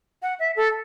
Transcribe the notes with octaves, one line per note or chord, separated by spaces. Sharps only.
F#5
E5
A4